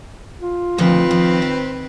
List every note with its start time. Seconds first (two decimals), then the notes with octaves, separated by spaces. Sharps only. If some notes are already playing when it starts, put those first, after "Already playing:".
0.41 F4
0.78 D2 A#2 D#3 F3 C4 B4
1.11 F3
1.42 C5